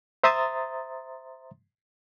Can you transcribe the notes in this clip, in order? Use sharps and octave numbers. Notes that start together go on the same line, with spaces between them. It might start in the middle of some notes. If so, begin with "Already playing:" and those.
C5 E5 A#5 C6 D#6 A6